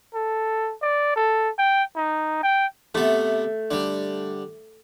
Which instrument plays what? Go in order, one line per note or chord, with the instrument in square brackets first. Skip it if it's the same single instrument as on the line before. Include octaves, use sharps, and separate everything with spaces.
[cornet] A4
D5
A4
G5
D#4
G5
[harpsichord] C3 B3 [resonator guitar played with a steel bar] A3
[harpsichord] D3 G3